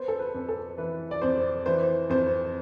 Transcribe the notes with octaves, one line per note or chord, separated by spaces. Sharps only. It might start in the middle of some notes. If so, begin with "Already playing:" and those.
Already playing: B3 C5
A4
B4
F2
A4
E3 B4
D5
F2 C5
E3 C5
F2 C5